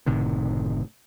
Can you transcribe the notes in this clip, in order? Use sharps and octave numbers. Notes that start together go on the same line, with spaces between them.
F#1 A2 C3 D#3